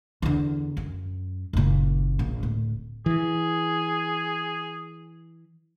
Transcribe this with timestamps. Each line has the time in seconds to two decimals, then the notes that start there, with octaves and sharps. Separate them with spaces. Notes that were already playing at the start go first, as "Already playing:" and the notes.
0.22 E2 D3
0.77 F#2
1.53 F#1 A#2
2.19 A#1
2.43 D1
3.06 E3 G#4